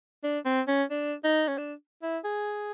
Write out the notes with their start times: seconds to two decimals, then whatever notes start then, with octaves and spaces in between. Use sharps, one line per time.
0.24 D4
0.45 C4
0.68 C#4
0.91 D4
1.24 D#4
1.48 C#4
1.58 D4
2.03 E4
2.24 G#4